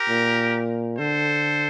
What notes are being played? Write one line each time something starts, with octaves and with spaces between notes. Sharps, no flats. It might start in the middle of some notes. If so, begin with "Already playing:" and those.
Already playing: G4 A#4
A#2
D3 A4 C5